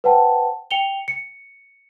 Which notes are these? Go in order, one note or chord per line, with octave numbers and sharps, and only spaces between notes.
B4 C5 F#5 G5 A5
G5 C#7 F7 G7
C#7